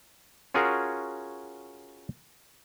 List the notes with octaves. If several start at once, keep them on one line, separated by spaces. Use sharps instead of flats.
C#4 F4 F#4 G#4 A#4